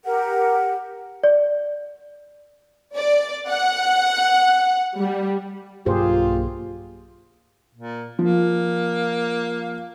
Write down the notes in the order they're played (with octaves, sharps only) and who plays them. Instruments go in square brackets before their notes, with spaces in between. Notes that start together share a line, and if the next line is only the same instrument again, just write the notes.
[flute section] G4 A#4 F#5
[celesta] D5
[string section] D5
F#5
G3
[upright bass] B1 [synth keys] G2 A#3 [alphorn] F4 [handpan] G4 G#4 C5
[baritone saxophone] A#2
[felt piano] F3 [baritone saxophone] A#3